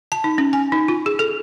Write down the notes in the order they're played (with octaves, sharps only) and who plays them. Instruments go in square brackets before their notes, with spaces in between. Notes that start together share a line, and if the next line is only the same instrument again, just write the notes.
[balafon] A5
D#4
C#4
G#5
D#4
F4
G#4
A4